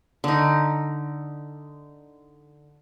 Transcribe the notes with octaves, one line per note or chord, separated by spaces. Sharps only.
D3 D#4